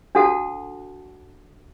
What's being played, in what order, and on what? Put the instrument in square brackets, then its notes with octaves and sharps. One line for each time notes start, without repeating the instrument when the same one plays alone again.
[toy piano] D4 F#4 A4 F#5 A5